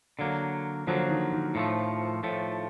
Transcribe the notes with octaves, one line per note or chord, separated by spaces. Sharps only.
D3 F#3 A#3
D3 F3 F#3 A#3
D#3
D#3
A2 F3 A3
A2 F3 A3